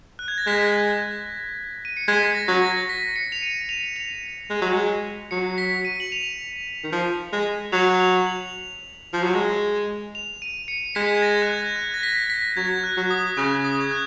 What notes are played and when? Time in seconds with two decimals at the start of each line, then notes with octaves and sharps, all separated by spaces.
0.19 F#6
0.28 G#6
0.38 A#6
0.47 G#3 B6
1.85 D#7
1.97 C#7
2.08 G#3 B6
2.35 A#6
2.48 F#3
2.62 A#6
2.89 B6
3.16 C#7
3.32 F7
3.42 D#7
3.69 F7
3.96 F7
4.50 G#3
4.62 F#3
4.73 G#3
5.31 F#3 C#7
5.58 B6
5.85 D#7
6.00 F#7
6.12 F7
6.84 D#3
6.92 F3
7.33 G#3
7.72 F#3 F7
8.00 F7
8.27 F#7
9.13 F3
9.24 F#3
9.34 G#3
10.15 F7
10.42 D#7
10.68 C#7
10.95 G#3 B6
11.14 G#6
11.22 A#6
11.42 F#6
11.50 G#6
11.76 F#6
11.94 A#6
12.03 B6
12.30 B6
12.57 F#3 G#6
12.84 F#6
12.97 F#3
13.10 D#6
13.37 C#3 C#6
13.64 D#6
13.80 G#6
13.91 F#6